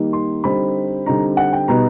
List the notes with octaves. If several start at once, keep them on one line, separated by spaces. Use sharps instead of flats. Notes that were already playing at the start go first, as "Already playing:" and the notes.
Already playing: D#3 G3 A#3 D#4
C6
D3 G3 C4 D#4 B5
D3 G3 C4 D#4 A#5
F#5
G5
B2 G3 B3 D#4 A#5